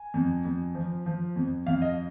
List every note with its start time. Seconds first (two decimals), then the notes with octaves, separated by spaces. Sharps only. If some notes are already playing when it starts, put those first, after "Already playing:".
Already playing: G#5
0.14 F2
0.45 F2
0.75 F3
1.06 F3
1.36 F2
1.67 F2 F5
1.82 D#5